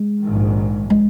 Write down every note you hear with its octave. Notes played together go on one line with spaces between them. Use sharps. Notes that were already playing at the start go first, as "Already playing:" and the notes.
Already playing: G#3
A#1 G#2 D#3
G#3